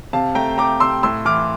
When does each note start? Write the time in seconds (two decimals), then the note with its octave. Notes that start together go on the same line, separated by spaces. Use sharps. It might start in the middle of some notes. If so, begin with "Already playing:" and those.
0.13 C3 F5 A5
0.35 A3 G5 A#5
0.58 A3 A#5 D6
0.80 C3 C6 E6
1.03 A2 C6 E6
1.25 E3 D6 F6